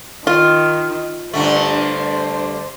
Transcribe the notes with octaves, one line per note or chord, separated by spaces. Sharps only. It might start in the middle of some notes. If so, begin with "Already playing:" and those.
D#3 F4
G2 D3 A3 C5